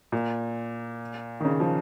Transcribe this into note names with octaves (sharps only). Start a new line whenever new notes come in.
A#2
D#3
C#3
F3